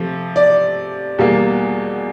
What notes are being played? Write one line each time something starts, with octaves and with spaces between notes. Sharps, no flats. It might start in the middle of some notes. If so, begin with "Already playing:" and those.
Already playing: C3 F3 A3
D5
E2 B2 G3 A#3